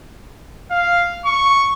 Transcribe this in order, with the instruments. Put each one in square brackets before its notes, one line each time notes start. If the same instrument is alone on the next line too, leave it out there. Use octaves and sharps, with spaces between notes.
[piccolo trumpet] F5
C#6